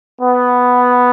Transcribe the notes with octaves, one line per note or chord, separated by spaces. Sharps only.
B3